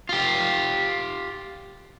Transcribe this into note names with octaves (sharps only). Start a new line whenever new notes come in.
F4 G4